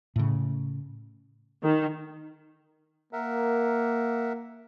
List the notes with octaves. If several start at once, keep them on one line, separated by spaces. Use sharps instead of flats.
A2 C#3
D#3
A#3 A#4 E5 F#5